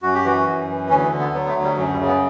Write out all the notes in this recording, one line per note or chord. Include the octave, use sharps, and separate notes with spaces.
F#2 F#4
G4
E3 F#4
F#2
E3
D2 C#4
D3
B3
F#3 B3
B3
A3
D2
G3
F#2 F#3
G3
C#3
B3